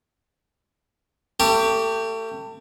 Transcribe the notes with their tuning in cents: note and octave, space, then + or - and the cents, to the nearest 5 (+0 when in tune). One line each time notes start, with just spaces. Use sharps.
A3 +35 G4 +0